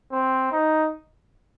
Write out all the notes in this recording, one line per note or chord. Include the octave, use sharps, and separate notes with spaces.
C4
D#4